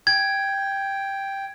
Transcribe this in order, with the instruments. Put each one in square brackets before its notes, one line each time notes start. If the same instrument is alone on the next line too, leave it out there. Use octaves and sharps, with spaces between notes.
[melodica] G5 [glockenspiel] G#6